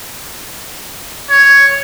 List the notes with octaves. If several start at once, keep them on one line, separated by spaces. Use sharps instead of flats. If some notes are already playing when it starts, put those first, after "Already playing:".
C#5